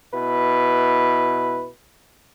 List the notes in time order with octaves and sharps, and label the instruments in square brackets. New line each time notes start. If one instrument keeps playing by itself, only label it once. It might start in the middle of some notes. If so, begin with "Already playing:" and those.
[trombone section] B2 E4 B4